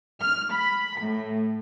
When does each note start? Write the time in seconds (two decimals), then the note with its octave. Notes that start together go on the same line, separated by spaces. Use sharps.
0.21 F6
0.52 B5
0.99 A2